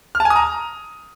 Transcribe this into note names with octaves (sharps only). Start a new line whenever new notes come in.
F6
A5
G#5
D#6
A#5